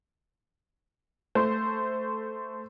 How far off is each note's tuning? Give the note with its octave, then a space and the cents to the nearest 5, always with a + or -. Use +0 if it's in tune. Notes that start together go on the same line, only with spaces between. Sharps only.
A3 +0 C5 -10